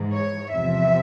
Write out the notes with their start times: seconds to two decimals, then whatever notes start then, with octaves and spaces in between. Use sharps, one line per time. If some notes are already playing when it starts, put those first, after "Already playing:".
Already playing: G#2 E3
0.12 C#5
0.52 E2 C3 F3 E5